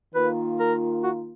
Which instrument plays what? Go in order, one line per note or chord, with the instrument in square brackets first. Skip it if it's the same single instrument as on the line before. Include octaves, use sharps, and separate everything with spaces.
[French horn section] D#3 A#3 F4 [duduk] B4
[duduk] A#4
F#4